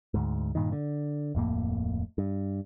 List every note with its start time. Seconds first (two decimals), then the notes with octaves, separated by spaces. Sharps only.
0.14 D2 G#2
0.55 G2 A#2 D#3
0.72 D3
1.35 D1 F2 A2 A#3
2.18 G2